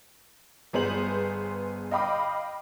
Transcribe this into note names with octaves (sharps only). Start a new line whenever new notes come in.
G1 B3 G#4 C5 F#7
D#5 F5 G5 B5 D6 D#6